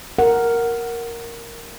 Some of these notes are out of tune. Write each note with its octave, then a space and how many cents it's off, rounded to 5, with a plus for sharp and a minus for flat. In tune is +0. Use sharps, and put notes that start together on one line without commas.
A#4 +0 F#5 +0